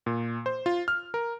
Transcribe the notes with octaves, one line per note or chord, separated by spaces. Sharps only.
A#2
C5
F4
F6
A#4